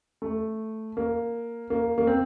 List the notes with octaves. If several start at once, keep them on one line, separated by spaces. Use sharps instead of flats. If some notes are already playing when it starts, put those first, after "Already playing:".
A3
A#3
A#3
A#3
C4